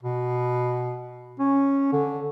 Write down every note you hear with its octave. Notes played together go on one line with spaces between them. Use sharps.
B2
C#4
D3